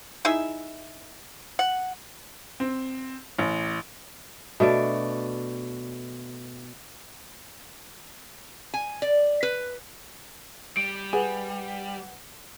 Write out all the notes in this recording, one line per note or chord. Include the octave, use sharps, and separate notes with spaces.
D#4 E4 G#4 E5
F#5
C4
A1
B2 A3 D4 D5
G#5
D5
B4
G3 D7
G#4 B4 F#5